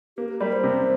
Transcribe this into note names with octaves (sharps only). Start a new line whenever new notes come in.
A#3 G4
A#4
G3 A#4
C5
C3